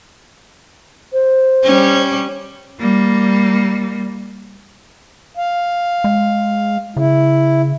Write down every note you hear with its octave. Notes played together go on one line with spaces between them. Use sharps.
C5
G3 C#4
G3 A#3
F5
G#3
C#3 E4